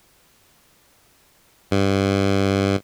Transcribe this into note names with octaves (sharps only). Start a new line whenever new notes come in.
G2